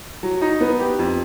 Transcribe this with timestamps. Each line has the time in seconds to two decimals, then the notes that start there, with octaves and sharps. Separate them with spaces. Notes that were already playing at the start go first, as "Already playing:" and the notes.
0.23 F#3
0.41 D#4
0.61 B3
0.79 G4
0.99 F2